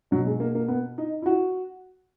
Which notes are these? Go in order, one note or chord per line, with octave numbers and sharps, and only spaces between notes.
B2 F#3
G#3
A#3
A#3
B3
D#4
E4
F#4